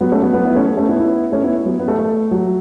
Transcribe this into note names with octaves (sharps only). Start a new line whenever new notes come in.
F#3 B3
A3 C#4
F#3 B3
F#3 B3
B3 E4
A3 C#4
A3
A3 C#4
B3 E4
B3 E4
A3 C#4
B3 E4
F#3 B3
B3
A3
A3
F#3